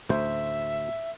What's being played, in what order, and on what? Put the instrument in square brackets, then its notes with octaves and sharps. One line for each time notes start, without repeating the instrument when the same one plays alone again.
[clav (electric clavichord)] D2 C5 [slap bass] A2 C#4 [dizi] E5